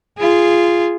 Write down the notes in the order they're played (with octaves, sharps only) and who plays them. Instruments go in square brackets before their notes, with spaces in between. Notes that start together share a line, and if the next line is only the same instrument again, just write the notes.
[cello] F4 G#4